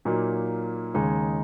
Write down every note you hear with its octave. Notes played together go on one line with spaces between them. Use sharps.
A#2 F#3 A#3 D#4
D#2 C#3 G#3 D#4